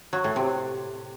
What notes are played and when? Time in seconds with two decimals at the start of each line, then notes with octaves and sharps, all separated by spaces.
0.13 F#3
0.24 A2
0.36 C3